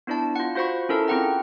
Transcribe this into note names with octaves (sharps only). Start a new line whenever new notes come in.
B3 D4 E4 D5 A5
F4 F#5
F4 F#4 C5 F#5 B5 C#6
C#4 E4 A4 A#4 A5
C4 F4 G#4 F#5 G5 A#5